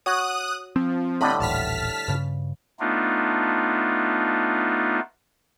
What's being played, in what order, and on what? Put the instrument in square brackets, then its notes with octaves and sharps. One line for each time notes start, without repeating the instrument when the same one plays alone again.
[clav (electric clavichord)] F#4 C#5 [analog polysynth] D#6 F#6
[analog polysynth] F3 [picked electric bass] C4
[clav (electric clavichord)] A2 D3 G3 [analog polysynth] D#5 B5
[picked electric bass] D#1 A1 [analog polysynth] A5 F6 B6
[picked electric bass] G2 C#3
[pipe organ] A3 B3 D4 D#4 F4